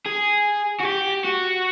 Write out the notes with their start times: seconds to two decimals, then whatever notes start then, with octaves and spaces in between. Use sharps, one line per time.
0.06 G#4
0.80 F#4
0.85 G4
1.24 F#4